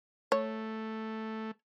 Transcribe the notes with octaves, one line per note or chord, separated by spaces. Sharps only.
A3 C#5